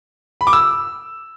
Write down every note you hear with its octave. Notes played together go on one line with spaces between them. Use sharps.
B5
D6
E6